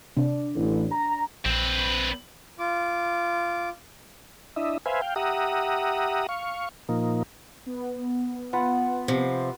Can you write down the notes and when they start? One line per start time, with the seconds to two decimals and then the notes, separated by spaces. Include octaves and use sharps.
0.17 C3 D4
0.56 A1
0.92 A#5
1.45 A#1 C4 B4
2.59 F4 D6
4.56 D4 E4 D#5 E5
4.86 B4 C5 E5 F5 G#5
5.02 F5 G5
5.16 G4 E5 F#5 A#5 D#6
6.29 F5 C#6
6.89 A#2 F3 A#3 D#4
7.66 B3
8.53 F4 B4 F#5
9.08 C3 F3